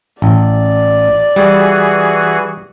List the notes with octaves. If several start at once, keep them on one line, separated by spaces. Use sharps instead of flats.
A1 D5
E3 G3 F#4 G#4